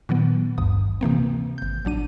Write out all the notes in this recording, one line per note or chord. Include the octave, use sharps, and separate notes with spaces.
A#2 D#3 F#3 B3
G#1 D2 G2 D#6
C3 E3 A#3 C4
G#1 G6
A#1 F#3 D4 D#7